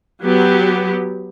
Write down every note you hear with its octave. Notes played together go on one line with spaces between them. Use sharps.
F#3 B3 G4